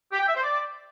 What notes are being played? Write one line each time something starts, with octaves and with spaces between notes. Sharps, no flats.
G4
G5
E5
C5
D5